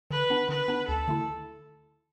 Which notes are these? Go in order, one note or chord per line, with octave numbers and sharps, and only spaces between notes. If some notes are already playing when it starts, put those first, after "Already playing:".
D3 B4
B3 D4
D3 B4
B3 D4
D2 A4
D3 A3 E4